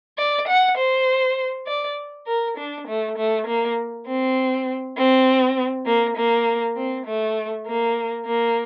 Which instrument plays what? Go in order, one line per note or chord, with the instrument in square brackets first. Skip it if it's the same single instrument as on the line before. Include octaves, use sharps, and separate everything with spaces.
[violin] D5
F#5
C5
D5
A#4
D4
A3
A3
A#3
C4
C4
A#3
A#3
C4
A3
A#3
A#3